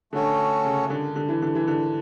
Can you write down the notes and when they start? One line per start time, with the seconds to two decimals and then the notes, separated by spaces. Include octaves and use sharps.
0.12 D3 A3 C#4 F#4 A4 C#5
0.64 C#3
0.90 D3
1.16 D3
1.29 E3
1.42 D3
1.55 E3
1.67 D3